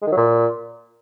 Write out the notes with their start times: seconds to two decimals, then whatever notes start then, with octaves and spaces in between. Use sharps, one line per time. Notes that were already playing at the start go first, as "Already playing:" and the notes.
0.02 G#3
0.07 D#3
0.12 F#3
0.17 A#2